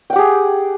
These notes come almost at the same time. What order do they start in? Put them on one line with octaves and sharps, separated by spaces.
G5 F#5 G4 G#4